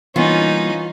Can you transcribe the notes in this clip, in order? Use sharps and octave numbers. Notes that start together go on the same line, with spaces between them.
E3 G3 A#3 B3 C#4 D#4 F4